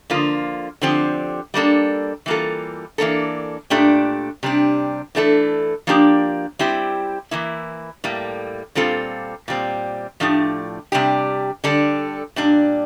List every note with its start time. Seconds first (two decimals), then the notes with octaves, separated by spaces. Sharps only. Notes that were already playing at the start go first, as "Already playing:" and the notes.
0.10 D3 F3 A#3 F4
0.82 D3 F3 C4 G4
1.54 G3 A#3 D4 A4
2.26 E3 G3 A#3 F4 A4
2.98 E3 A#3 D4 A4
3.70 A#2 A3 D4 G4
4.43 C3 G3 D4
5.15 E3 A3 D4 F4 A4
5.87 F3 A#3 D4 G4
6.59 G3 C4 E4 G4
7.31 E3 A#3 E4
8.04 A2 G3 A#3
8.75 A#2 G3 C4 F4 A4
9.48 A#2 G3 C4
10.20 A2 F3 A3 D4 G4
10.92 C3 G3 D4 G4
11.64 D3 G3 D4 A4
12.36 A#2 G3 D4